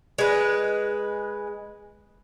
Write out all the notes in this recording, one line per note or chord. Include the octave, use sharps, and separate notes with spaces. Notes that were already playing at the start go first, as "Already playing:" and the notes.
G#3 B4